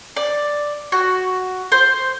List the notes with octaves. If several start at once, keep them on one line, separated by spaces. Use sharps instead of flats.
D5
F#4
C5